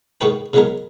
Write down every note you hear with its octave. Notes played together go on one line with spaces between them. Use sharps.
G#2 D#3 F#4 B4 G5
C#3 E3 F#3 G#3 B3 A#4